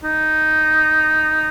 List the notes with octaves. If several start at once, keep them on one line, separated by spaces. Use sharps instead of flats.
D#4